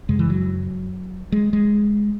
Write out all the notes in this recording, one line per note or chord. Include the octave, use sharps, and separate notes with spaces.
F#2 C#3 G#3
E3
F#3
G#3
G#3